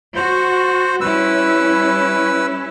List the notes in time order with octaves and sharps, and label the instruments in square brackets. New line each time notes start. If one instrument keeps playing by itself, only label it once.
[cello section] F#4 [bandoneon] C5
[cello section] G3 C#4 E4 [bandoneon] B4 E6